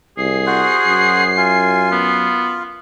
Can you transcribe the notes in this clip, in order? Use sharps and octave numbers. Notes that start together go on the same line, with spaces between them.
C2 G#4 C7
F#4 C5 F#5
F#2
F4 G#5
B3